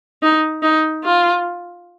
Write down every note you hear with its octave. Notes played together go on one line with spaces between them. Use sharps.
D#4
D#4
F4